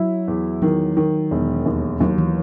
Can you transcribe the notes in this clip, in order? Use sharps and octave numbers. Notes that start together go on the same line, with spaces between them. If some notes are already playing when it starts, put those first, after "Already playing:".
Already playing: F#3 E4
E2
D#3 F#3
D#3
E1
D#2
D#2 F#3
E3